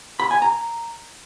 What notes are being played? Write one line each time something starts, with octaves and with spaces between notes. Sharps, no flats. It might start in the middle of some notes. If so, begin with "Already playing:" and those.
B5
G#5
A#5